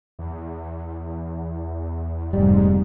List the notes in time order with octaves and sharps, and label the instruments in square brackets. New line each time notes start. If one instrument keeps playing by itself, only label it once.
[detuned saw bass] E2
[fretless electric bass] F1 G3 [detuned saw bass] G#2